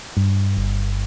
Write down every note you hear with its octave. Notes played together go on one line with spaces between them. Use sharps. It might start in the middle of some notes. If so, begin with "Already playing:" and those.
G2
G1